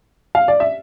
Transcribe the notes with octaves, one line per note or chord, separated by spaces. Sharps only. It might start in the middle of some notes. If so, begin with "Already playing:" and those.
F5
D5
E5